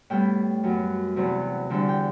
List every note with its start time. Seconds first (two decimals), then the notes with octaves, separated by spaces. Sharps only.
0.10 A2 G3 B3 G5
0.64 F#2 F#3 B3
1.16 E2 C3 F#3 B3
1.70 E2 D3 G3
1.89 G5